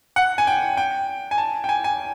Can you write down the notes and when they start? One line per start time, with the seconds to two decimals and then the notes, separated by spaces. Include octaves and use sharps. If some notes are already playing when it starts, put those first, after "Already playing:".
0.16 F#5
0.38 G#5
0.47 G5
0.77 G5
1.31 G#5
1.38 A5
1.64 G5
1.69 G#5
1.84 G#5